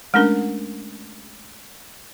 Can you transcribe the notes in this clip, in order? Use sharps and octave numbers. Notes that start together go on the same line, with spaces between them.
G#3 A3 C#4 D4 A#4